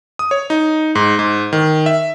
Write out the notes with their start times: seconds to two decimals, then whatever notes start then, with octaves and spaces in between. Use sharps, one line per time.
0.19 D#6
0.31 C#5
0.50 D#4
0.95 G#2
1.19 G#2
1.53 D#3
1.86 E5